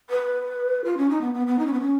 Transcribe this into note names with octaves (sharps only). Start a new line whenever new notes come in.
B4
F4
C#4
D#4
B3
B3
B3
D#4
C#4
B3
C#4